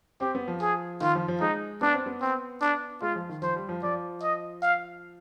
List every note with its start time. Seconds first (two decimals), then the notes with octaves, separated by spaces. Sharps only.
0.21 C4 G4
0.35 B3
0.48 F3
0.62 G#4
1.01 D#3 F4
1.15 F3
1.28 F3
1.41 G#3 D#4
1.81 B3 D4
1.94 C4
2.06 B3
2.22 C4
2.62 D4
3.02 G#3 F4
3.16 F3
3.29 D#3
3.42 F3 C5
3.56 G3
3.69 F3
3.83 F3 D5
4.22 D#5
4.62 F5